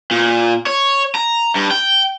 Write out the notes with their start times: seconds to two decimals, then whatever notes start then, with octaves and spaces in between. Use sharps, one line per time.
0.11 A#2
0.66 C#5
1.15 A#5
1.55 G2
1.71 G5